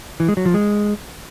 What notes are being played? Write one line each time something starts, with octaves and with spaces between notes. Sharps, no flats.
E3
G#3
F#3
F3
G#3